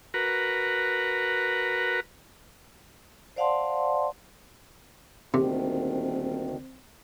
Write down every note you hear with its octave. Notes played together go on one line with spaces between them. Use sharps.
F#4 A#4 B4
C5 D5 F5 F#5 A5 C6
D#1 D2 C3 D#3 C4